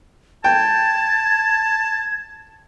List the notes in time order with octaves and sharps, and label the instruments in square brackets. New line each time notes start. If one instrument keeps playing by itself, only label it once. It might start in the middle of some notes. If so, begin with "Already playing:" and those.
[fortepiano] G5 [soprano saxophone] A5 [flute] G#6